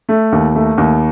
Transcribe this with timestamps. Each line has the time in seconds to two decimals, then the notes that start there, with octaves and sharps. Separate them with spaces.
0.09 A3
0.32 D#2
0.55 A3
0.78 D#2